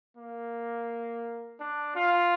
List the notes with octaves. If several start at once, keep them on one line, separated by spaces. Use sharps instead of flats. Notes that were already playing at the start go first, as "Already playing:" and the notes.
A#3
D4
F4